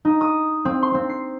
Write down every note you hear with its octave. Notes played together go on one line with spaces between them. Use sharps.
D#4
D#6
C4
C6
C4
C7